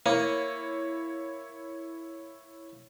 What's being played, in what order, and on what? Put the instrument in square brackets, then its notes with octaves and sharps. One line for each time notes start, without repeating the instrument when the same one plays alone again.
[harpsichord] A#3 [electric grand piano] E4 C#5 D#7